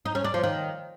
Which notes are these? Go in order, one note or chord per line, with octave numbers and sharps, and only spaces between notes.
D#4
C#4
D4
F3
D#3